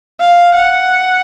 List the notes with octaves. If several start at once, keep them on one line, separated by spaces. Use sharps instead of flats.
F5
F#5